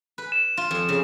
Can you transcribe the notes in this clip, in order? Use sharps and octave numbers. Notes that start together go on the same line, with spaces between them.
B4
E7
F4
F2
C#3